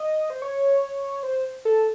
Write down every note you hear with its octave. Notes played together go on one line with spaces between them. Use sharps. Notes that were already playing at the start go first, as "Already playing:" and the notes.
Already playing: D#5
C5
C#5
C5
A4